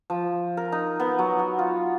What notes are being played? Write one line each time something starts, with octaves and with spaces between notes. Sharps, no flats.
F3
A#4
D#4
B3
F#3
F#4
F4